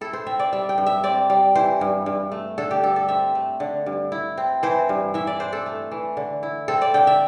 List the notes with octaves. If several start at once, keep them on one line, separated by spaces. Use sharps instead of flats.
E4 A4
C5
C4 E5
D5
G3 E5
G5
G2
E5
C4 D5
G3
E3 C5
G2
G2
A3
D3 A4
G4
G2 A4
A4
C4 E5
A3
D3
G2
E4
C4
E3 C5
G2
E3 E5
D5
D4 C5
A4
A3
E3
D3
E4
C4 A4
D5
D3 G5
E5